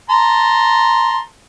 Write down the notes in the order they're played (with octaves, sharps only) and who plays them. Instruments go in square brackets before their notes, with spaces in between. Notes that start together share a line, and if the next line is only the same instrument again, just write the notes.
[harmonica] A5 A#5 C6